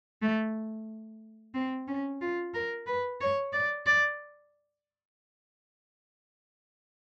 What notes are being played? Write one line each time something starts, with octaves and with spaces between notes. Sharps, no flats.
A3
C4
C#4
F4
A#4
B4
C#5
D5
D5